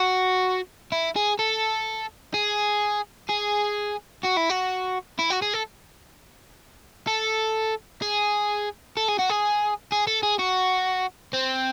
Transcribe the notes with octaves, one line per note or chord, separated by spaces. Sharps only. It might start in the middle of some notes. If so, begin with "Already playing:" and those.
Already playing: F#4
E4
G#4
A4
G#4
G#4
F#4
E4
F#4
E4
F#4
G#4
A4
A4
G#4
A4
G#4
F#4
G#4
G#4
A4
G#4
F#4
C4